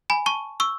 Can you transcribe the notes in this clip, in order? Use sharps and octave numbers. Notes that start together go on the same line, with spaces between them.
G#5 B5
A5 C#6
C#6 E6